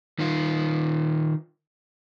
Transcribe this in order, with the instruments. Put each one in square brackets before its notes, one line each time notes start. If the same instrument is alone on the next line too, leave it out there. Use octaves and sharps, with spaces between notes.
[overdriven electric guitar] D#3 F4